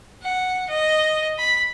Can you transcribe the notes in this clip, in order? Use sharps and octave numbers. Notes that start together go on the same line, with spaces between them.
F#5
D#5
B5